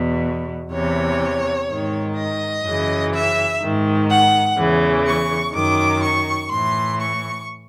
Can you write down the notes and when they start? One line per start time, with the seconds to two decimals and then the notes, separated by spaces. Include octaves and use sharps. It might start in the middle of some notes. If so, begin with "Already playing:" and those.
Already playing: E2 B2
0.71 E2 C3 E3 C#5
1.69 G#2 D#3
2.16 D#5
2.64 F#2 C#3 E3
3.13 E5
3.61 G#2 D#3
4.10 F#5
4.58 E2 C#3 E3
5.07 C#6
5.54 F#2 D#3 D6
6.02 C#6
6.50 A2 E3 C6
6.99 C#6